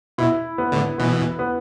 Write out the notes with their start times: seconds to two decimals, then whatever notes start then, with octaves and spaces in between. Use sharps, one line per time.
0.18 B2 E4
0.58 B3
0.72 A2 D3
0.98 B2 E3 B3
1.39 B3